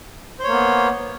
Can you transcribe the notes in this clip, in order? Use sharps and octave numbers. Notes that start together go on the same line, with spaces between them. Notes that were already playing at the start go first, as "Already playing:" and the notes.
A#3 B3 C5 C#5